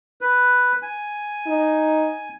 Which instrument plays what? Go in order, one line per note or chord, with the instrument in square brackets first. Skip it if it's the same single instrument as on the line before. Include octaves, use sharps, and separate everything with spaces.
[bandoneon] B4
G#5
[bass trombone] D#4